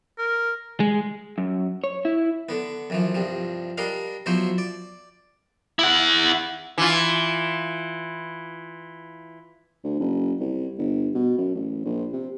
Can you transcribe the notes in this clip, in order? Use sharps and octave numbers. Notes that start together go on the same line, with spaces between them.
A#4
G#3
F#2
C#5
E4
D3 B3
F#2 E3 F3
C2 G2 F3
G3 D4 A#4 D#5 F5
B2 F3 F#3 E4 C5
D5
E4 F#5
E3 F4
D2
F#1
C2
G1
B2
F#2
A1
A#1
C3